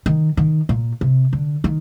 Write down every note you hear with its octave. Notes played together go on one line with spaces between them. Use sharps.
D#3
D#3
A#2
C3
D3
D#3